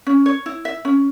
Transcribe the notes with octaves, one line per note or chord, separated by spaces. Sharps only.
C#4
C#5
E4
E5
C#4